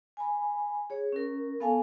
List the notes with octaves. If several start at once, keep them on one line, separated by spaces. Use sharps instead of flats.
G#5 B5
G#4 C#5
C#4 A#4
B3 A4 F5 G#5 A5